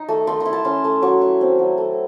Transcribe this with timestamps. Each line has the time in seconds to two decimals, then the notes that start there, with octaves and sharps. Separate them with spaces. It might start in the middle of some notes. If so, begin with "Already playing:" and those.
Already playing: D#4
0.09 A3
0.27 A3 C6
0.40 C6
0.45 E4
0.53 A5
0.65 C#4 C6
0.84 A3
1.02 F#3 C#6
1.22 E4
1.41 C4
1.59 F#3
1.78 A3